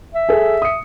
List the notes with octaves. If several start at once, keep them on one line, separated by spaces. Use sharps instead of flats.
E5
G#4 A4
D#6 C#7